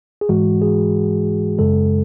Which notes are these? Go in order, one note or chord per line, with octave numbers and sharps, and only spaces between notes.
G#4
G#2 E3 G#3 F#4
G#4
F#2 C#3 G#3 A4